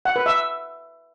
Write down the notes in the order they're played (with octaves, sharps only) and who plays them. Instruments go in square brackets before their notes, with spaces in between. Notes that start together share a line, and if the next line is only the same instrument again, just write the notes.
[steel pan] F#5
B4
E5